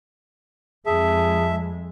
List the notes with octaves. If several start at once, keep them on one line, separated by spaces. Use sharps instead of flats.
F2 G#3 G#4 E5 A5